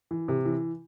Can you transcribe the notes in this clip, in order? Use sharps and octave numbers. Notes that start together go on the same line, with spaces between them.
E3
C3
E3